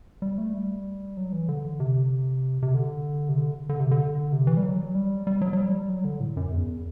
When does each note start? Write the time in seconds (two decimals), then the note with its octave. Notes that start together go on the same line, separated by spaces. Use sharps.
0.22 G3
0.38 A3
0.54 G3
1.17 F#3
1.33 E3
1.48 D3
1.80 C3
2.62 C3
2.74 D3
3.29 C3
3.37 D3
3.69 D3
3.80 C3
3.91 D3
4.32 C3
4.47 E3
4.57 G3
4.63 F#3
4.95 G3
5.27 G3
5.41 F#3
5.53 F#3
5.57 G3
5.89 F#3
6.05 D3
6.20 A2
6.37 F#2
6.52 E2